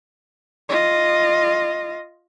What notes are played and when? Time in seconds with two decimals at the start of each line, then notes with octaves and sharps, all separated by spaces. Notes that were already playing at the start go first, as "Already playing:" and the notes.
0.69 F4 D#5